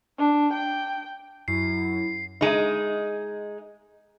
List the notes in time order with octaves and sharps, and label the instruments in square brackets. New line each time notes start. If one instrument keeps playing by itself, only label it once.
[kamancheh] D4
G5
[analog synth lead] F#2 [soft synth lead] E4 [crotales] C7
[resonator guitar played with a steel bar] G#3 D#4